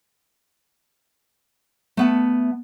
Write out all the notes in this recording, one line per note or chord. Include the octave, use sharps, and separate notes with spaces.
A3 B3 A5